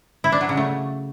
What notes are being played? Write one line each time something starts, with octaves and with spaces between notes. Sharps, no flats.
E4
D4
F#3
C#3
A3